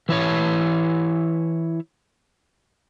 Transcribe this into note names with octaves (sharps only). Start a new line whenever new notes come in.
E3 E4 C#5